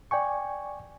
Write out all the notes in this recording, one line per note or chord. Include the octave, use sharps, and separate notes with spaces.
D5 G5 G#5 C#6